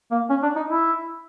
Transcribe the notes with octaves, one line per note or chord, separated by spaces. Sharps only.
A#3
C#4
D4
D#4
E4